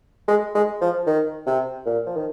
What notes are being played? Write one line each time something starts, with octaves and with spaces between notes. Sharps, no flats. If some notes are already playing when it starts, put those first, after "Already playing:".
G#3
G#3
F3
D#3
C3
A#2
F3
D#3